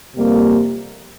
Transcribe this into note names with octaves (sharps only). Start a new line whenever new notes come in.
F2 C3 G3 A#3